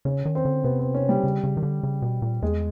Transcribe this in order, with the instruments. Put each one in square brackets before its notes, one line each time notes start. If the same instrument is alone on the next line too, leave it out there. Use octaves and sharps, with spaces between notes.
[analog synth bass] C#3 [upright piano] C#4
[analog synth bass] D#3
[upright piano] C4
[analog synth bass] D3
[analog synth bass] C3 [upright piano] B3
[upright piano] C4
C#4
G3
[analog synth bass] C#3
C#3
D#3
D3
C#3
B2
A#2
[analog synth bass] E2 [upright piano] G#3